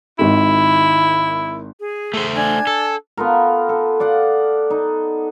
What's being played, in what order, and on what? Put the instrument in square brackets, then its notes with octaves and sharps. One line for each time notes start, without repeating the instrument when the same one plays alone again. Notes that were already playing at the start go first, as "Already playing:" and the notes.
[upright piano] G#1 D#3 [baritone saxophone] E4
[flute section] G#4
[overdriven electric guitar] A3 C5
[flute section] D4 G#5 G#6
[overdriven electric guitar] A4
[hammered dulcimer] B3 F4 A4 A#4
A4
D5 F5 F#5
D#4